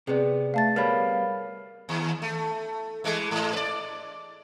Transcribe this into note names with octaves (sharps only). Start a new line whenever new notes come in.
C3 B3 G#4 D5
A3 F5 A5 A6
G3 B3 A#4 C#5 F5 B5
D#2
A3
E3 G#3 A3
G#2
B4 D5